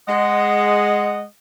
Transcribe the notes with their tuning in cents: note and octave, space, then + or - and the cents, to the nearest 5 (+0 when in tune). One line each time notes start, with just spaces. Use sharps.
G#3 +0 D#5 -15 F#5 +0